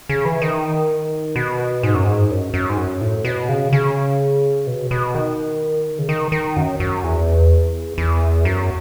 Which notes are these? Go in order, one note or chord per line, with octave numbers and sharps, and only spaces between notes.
C#3
E3
D#3
B2
G#2
F#2
G#2
F#2
F#2
G#2
F#2
A2
B2
C#3
C#3
B2
B2
D#3
C#3
D#3
D#3
F#2
F#2
E2
E2
F#2